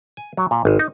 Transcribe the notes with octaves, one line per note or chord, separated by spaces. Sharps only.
G#5
F#3
A#2
G#1
D#4